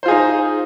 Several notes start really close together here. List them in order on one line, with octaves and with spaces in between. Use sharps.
C5 F4 G#4 D#4